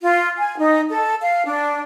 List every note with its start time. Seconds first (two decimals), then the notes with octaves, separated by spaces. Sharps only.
0.02 F4
0.38 G#5
0.58 D#4
0.89 A4
1.21 F5
1.45 D4